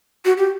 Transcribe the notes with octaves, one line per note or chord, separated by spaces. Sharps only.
F#4
G4